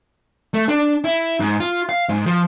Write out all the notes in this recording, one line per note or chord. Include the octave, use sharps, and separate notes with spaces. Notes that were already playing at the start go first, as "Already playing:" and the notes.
A3
D4
E4
G#2
F4
F5
G#2
F3